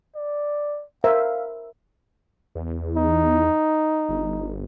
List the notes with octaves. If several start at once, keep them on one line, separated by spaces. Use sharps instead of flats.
D5
A#4 C5 E5 F5
E2
D#4
G1